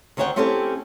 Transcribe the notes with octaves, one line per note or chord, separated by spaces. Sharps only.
D2 D#3 C5 C#5 F#5 G5
A3 C4 C#4 E4 G4 A4